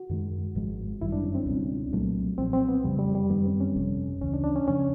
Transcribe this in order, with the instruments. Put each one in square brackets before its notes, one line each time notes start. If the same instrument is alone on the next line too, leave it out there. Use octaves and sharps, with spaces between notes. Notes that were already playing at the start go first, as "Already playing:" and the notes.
Already playing: [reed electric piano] F#4
[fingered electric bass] F#2 D#3 G#3
G#1 G#2 F3 G#3
[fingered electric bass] G1 F#2 D#3 G3 [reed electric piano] E4
[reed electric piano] D4
C#4
C4
[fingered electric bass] C#2 B2 G3
C2 A#2 F#3 A3
[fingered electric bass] B1 A#2 F3 [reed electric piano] C4
[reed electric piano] C4
B3
[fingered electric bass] F2 C#3 F3 [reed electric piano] G3
[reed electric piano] G3
G3
[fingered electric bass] F#2 D#3 G3 [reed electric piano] B3
[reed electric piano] C4
C#4
[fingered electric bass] G1 F2 C3
[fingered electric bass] D2 C#3 E3 [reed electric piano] C#4
[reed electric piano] D4
D4
C#4
[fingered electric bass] F2 C#3 F3 [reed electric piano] C#4